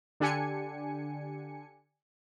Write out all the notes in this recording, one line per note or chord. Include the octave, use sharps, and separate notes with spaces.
D3 D4 G4 G#5 C#7